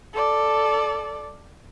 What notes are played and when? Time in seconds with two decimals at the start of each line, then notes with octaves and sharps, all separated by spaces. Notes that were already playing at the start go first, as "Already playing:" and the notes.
0.14 A4 D5